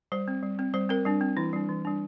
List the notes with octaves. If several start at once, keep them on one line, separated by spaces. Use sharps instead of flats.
G3 C5
C4
G3
C4
G3 C5
C4 A#4
G3 D4
C4
E3 E4
G3 D4
E3
G3 D4